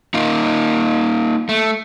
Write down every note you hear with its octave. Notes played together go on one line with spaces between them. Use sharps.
A#3 D#4 F4
A3